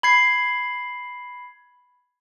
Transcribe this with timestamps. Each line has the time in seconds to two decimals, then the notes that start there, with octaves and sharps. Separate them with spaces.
0.03 B5 G#6 C7